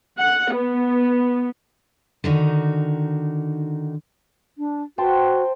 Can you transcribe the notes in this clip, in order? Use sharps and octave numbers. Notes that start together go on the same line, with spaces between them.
F#5
B3
D3 D#3 D#4 F#4
D4
F#4 C5 G5 A5